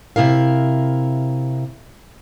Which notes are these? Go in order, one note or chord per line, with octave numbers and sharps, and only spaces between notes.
C3 E4 A#4 F5